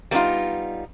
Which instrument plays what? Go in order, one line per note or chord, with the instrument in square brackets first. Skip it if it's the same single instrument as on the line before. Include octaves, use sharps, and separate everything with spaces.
[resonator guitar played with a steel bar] G3 A#3 B3 C#4 D#4 F4